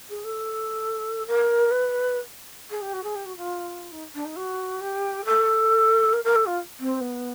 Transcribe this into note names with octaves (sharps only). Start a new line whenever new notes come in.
G#4
A4
A#4
B4
G#4
G4
F#4
G#4
G4
F#4
F4
D#4
D4
D#4
F#4
G4
A4
A#4
A#4
A4
F4
C4
B3